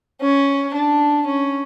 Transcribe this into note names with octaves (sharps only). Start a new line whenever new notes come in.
C#4
D4
C#4